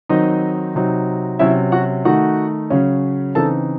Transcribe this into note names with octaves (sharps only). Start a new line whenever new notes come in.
D#3 F#3 C4 D#4 D#5
C3 F#3 C4 D#4
C3 F#3 C#4 E4 E5
F#4 F#5
D#3 A3 D#4 F#4 F#5
C#3 F#3 C#4
C#3 E3 C4 D#4 A4 A5